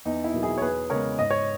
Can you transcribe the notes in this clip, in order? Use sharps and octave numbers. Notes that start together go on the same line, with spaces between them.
E2 D#4
E4
B2 F#3 A#3
E4 G#4
C#5
E2 G#4 B4
C#3 G#3 B3 A#4 C#5
G#2 D#5
C#5